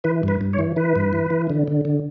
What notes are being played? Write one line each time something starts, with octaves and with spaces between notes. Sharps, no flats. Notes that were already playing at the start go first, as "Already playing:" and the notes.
E3 B4
G2 B4
G2
C#5
E3
E3 B4
G2
E3
E3
D3
D3
D3